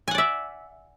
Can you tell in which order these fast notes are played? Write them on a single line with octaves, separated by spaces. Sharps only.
G#5 F#5 D5 E5